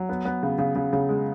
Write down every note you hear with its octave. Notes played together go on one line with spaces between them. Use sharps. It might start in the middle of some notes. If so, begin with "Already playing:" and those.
Already playing: F#3
B3
B3
C#3
C#3
C#3
C#3
G#3